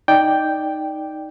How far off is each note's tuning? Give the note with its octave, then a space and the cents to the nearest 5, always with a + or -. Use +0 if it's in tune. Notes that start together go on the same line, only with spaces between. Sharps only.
D#4 +0 D5 +0 G5 +0